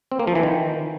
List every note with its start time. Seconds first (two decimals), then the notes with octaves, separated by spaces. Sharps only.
0.12 C4
0.19 A#3
0.27 F3
0.35 E3
0.43 D#3